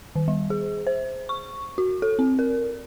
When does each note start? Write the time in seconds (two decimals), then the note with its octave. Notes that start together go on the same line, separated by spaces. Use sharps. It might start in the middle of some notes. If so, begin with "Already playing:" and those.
0.16 D#3
0.28 G3
0.50 G#4
0.87 C5
1.29 C#6
1.78 F#4
2.02 A4
2.19 C4
2.39 A#4